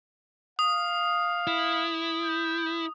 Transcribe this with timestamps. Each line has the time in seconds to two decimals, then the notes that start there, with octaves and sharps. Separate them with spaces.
0.59 F5 D#6
1.47 E4
2.23 G6